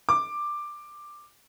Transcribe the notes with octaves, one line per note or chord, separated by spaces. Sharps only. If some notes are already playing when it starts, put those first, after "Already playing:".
D6